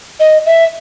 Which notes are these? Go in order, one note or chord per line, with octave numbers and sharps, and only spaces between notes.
D#5
E5